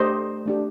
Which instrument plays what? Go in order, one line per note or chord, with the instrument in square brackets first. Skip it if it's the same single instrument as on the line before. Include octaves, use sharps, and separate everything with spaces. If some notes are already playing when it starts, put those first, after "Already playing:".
Already playing: [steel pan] A3 D4 G4 C5 D#5
A3 D4 G4